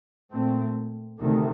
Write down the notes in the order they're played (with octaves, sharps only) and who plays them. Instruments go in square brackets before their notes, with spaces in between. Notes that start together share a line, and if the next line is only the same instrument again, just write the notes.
[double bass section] A#2 A3 C4
D2 C3 D#3 A3